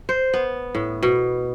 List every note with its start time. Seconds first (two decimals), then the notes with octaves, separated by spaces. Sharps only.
0.09 C5
0.34 B3
0.75 A2
1.03 B2